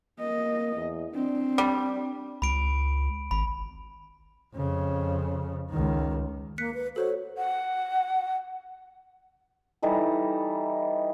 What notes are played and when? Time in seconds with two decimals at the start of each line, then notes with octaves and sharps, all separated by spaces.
0.20 A#3 D#5
0.75 E2
1.15 C4 D4
1.58 G3
2.42 C#2 B5 D7
3.31 G#1 B5
4.55 F2 C#3
5.70 C#2 D#3
6.58 A#3 F#6 B6 C#7
6.74 B4
6.96 F#4 A4 C5 C#5
7.38 F#5
9.82 E3 G3 D#4 A4